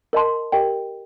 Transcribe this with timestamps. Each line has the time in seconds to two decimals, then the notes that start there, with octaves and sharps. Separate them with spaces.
0.13 A#4 D#5 A5 C6
0.52 G4 A#4 D#5 G5